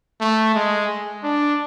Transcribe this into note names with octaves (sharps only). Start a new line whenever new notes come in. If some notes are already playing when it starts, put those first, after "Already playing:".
A3
G#3
D4